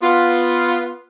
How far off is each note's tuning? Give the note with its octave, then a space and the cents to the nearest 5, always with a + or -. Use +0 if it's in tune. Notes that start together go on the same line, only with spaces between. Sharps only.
B3 +0 F4 +0